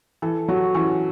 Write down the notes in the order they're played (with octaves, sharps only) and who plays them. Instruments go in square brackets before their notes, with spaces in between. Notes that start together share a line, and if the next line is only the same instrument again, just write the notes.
[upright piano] E3 [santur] A4
[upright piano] F#3 [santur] F#4
[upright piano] E3 [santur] C#4